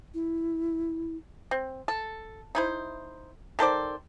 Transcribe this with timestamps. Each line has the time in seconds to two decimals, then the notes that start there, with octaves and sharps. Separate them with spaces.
0.14 E4
1.51 C4
1.88 A4
2.55 D#4 E4 C5
3.59 D#3 A4 C5 D5